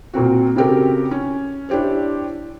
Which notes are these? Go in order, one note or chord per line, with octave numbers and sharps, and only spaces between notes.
A#2 A#3 C4 F#4
C#3 C4 F#4 G4 A4 A#4
C#4
D4 E4 G4 C5 C#5